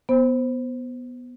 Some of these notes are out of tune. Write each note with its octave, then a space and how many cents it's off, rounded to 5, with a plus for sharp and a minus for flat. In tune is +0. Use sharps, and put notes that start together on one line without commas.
B3 +0 C5 +0